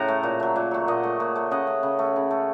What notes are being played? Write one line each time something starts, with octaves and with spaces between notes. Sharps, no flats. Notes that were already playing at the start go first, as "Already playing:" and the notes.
Already playing: A2 C#3 F#5 A#5
A3
A#2
F#3 A3
A#2
F#3 A3
A#2 D#5 F#5
A3
A#2
A3
C#3 D#5 F#5
A3
C#3
A3
C#3
A3